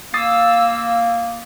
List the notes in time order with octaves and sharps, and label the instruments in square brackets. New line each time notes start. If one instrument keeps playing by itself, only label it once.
[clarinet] A#3 [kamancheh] F5 E6 [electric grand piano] D#6 A6 C7